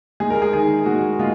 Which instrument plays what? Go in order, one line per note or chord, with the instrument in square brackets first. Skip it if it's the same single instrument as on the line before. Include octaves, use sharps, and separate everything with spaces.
[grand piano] G#3 G#4
A#4
G#4
D#3 G#4
G#3 F#4
G#3 F4